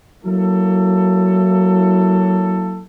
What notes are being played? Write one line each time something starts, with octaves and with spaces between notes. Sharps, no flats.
F#3 A#3 E4 A4